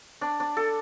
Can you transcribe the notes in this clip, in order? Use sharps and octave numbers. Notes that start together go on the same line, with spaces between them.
D4
D4
A4